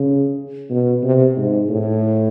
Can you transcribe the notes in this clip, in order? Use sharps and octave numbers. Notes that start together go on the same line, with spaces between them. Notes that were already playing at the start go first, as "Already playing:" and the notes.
Already playing: C#3
B2
C3
G#2
A2